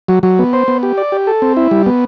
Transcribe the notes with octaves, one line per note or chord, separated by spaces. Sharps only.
F#3
F#3
B3
C5
B3
G4
D5
G4
A4
C4
E4
G3
B3